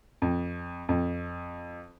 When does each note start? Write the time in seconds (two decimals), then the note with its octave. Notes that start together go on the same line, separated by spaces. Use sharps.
0.22 F2
0.89 F2